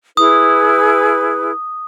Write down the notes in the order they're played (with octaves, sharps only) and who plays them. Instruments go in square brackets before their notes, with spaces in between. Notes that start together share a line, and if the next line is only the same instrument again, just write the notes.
[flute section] E4 G#4 B4 [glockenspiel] D#6